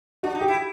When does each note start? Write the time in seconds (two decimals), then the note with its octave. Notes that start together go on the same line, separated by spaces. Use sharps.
0.23 D4 F#4
0.35 D#4
0.41 G4
0.48 E4